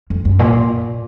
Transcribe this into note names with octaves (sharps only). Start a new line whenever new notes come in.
F2
F#2
A#2